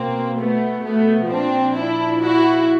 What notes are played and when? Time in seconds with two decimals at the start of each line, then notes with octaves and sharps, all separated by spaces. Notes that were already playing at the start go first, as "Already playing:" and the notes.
Already playing: B2 A#3 C4
0.40 A3 B3
0.86 A3 B3
1.32 A#2 F3 C4 D4
1.78 D4 E4
2.24 E4 F#4